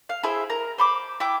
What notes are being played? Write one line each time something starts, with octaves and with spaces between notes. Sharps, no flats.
F5
E4 G#4 C5 E5
A#4 A#5
C5 B5 D6
E4 G5 D6